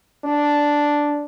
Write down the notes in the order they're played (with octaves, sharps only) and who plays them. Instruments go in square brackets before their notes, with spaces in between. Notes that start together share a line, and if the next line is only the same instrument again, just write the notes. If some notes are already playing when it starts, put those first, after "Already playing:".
[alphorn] D4